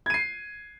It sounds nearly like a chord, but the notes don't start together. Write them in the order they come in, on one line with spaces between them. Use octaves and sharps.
G#6 D#7 C7